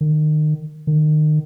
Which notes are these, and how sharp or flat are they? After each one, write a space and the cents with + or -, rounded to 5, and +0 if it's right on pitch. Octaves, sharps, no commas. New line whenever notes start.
D#3 -30
D#3 -30